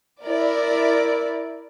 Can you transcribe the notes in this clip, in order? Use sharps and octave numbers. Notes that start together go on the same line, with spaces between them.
E4 A#4 D5